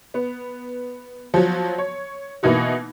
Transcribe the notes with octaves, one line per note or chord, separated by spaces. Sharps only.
B3
F3 F#3
C#5
B2 E3 A#3 D#4 F#4